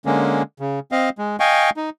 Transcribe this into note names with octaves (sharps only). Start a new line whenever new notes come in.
D3 G#3 A#3 C#4
C#3
C4 D#5 F5
G#3
D#5 F5 G5 G#5 C#6
D#4